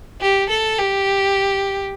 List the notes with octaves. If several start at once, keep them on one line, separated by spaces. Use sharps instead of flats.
G4
A4
G4